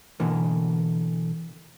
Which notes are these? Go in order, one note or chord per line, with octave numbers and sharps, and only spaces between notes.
B2 D3 E3 A#3